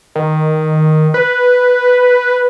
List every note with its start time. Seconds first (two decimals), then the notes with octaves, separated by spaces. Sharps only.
0.15 D#3
1.14 B4